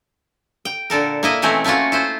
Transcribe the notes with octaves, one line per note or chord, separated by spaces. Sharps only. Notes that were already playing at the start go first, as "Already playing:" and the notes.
G5
A#2 D3 A4 A#4
A#3 E4 D#5
B2 E3 A3 C4 C#4 A#4
A3 A#3 C#4 F4 F#4
E4 F4 C5